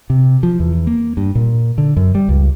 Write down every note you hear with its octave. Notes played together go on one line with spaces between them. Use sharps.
C3
F3
E2
A#3
G2
A#2
D3
F#2
G3
C#2